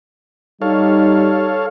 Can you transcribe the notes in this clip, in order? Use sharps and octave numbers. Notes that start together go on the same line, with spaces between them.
G3 D#4 A4 C#5 F5